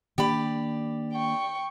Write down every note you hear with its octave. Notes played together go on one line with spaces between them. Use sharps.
D#3 A#3 D4 G4 D5 B5
G5 C#6